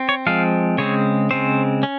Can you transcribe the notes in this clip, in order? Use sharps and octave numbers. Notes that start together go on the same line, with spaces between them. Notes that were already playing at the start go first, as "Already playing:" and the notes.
Already playing: C4
C#5
F3 G#3 C4 F5
C#3 G#3 C4 C#5
C#3 G#3 C4 C5
C#4